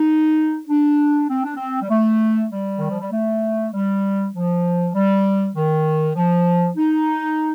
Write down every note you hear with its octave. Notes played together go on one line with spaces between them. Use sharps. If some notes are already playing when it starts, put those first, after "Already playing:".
Already playing: D#4
D4
C4
D4
C4
G3
A3
G3
D#3
F3
G3
A3
G3
F3
G3
D#3
F3
D#4